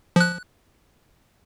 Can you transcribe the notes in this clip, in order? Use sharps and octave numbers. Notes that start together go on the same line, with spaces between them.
F3 F#6